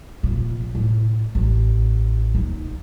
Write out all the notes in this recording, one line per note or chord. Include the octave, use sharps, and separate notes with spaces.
A#2 F3
A2
A1
D#2 D#4